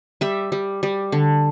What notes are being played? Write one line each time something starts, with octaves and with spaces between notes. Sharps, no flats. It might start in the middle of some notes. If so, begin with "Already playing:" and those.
G3 E5
G3
G3
D3